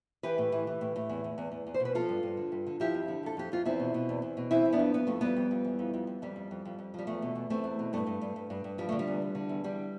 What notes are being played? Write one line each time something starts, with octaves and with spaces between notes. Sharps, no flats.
E3 G4 B4
A2
E3
E3
A2
A2
E2
E2
E2
E2
E2
C5
B2
B4
F3 F4 A4
G2
G2
D3
G2
D3
F3 E4 G4
F2
D3
F2 A4
F2 G4
F2 F4
E2 C4 E4
B2
B2
E2
E2
B2
E3 C4 E4
E3
B3 D4
F2
F2 B3
F2 A3
F2 G3 B3
F2
F2
E3
F2
F2
F2
F2 G3
F2
F2
F2
F2
F3 G3
E2 A3
B2
E2
E2 A3 C4
E2
B2
G2 A3
G2
G2
G2
G2
G2
F3 G3
D3 A3
G3
E2
E2
D3
E2
D3 G3